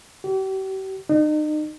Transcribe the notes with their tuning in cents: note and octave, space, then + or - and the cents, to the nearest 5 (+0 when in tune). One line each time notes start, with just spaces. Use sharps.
G4 -40
D#4 -35